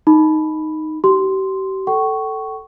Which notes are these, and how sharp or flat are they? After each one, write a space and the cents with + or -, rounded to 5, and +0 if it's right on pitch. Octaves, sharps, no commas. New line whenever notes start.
D#4 +0 B5 +0
G4 -35 C6 -5
A4 +0 G5 -45 C#6 +0